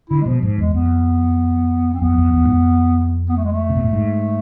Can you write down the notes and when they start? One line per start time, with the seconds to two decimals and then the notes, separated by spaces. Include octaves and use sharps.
0.10 D3 E4
0.21 G#3
0.26 B2 F3
0.41 G#2 F3
0.58 E2 G#3
0.74 F2 B3
1.94 C4
2.01 F2 B3
2.18 F2
2.33 E2
2.45 G#2
2.50 F2
3.29 B3
3.37 A3
3.45 G#3
3.52 A3
3.70 C3
3.77 B2
3.84 A2
3.93 G#2